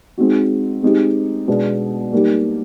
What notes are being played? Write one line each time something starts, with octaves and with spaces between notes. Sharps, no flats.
G#3 C4 D#4 F#4
G#3 C4 D#4 G4
B2 G#3 B3 D4
G3 A#3 D#4 G4